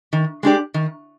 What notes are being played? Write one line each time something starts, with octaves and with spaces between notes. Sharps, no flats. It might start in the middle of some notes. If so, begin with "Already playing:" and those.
D#3
G#3 D4 G4 D5
D#3